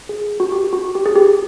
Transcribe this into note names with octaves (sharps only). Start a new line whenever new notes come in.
G#4
F#4
G4
F#4
G4
G#4
G4